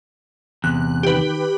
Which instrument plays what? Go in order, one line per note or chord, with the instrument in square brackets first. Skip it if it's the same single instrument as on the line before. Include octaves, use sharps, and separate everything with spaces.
[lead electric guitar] E2 C3 [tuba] B3 [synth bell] F#6
[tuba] D#3 [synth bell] G4 B4